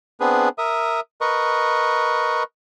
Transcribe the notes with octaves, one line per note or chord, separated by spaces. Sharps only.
B3 C4 D4 G#4 B4
A#4 E5 D#6
A#4 B4 D#5 C#6